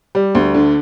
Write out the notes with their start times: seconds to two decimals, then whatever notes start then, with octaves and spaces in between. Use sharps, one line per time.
0.15 G3
0.35 D2
0.55 D3